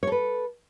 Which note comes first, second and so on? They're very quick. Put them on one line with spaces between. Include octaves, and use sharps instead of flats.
C#5 A4 B4